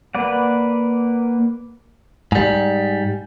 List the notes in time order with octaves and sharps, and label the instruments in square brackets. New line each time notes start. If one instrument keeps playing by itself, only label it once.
[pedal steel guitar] A#3 B4 D5 F#5
[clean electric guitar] G#2 G3